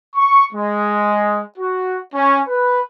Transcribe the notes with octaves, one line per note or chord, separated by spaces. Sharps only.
C#6
G#3
F#4
C#4
B4